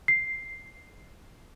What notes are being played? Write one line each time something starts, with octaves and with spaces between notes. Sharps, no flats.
C7